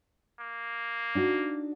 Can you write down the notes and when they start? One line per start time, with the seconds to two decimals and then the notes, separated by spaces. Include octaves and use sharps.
0.39 A#3
1.15 D4 D#4 F#4